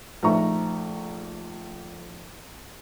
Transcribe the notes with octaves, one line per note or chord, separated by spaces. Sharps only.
A#1 A3 D#4 E5 A#5 C#6